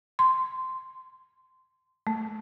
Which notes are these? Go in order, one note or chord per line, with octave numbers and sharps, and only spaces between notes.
C6
A3